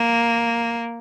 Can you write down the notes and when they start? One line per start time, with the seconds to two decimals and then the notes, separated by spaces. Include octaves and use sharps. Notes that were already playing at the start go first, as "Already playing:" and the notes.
Already playing: A#3